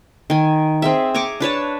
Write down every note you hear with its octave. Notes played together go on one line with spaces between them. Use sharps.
D#3 G#5
C4 G#4 E5
G#5 A#5 C#6 D6
D4 B4 C#5 A5